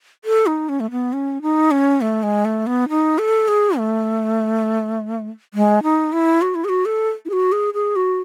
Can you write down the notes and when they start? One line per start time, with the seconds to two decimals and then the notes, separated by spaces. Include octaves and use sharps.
0.25 A4
0.47 D#4
0.69 C#4
0.80 A3
0.91 B3
1.13 C#4
1.42 D#4
1.71 C#4
2.01 A3
2.23 G#3
2.45 A3
2.67 B3
2.89 D#4
3.18 A4
3.48 G#4
3.78 A3
5.54 G#3
5.83 D#4
6.13 E4
6.42 F#4
6.55 E4
6.64 G#4
6.69 F#4
6.85 A4
7.25 E4
7.30 G#4
7.33 F#4
7.52 G#4
7.74 G#4
7.96 F#4